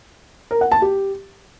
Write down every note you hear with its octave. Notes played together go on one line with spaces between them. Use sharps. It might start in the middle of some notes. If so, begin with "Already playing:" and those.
A#4
F#5
A5
G4